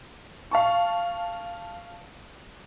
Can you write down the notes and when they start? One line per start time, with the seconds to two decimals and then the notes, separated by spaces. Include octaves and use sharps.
0.51 F5 A5 C#6